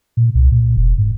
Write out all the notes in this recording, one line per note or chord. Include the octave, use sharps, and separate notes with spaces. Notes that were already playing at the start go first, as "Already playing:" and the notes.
A#2
C2
A#2
F1
G#2